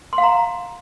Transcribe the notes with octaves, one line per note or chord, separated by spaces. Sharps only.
C6
F5
A#5